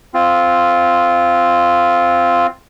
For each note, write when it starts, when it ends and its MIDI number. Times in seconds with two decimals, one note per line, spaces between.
0.14 2.47 60
0.14 2.47 65